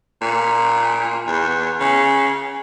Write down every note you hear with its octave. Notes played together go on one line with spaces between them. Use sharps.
A#2
E2
C#3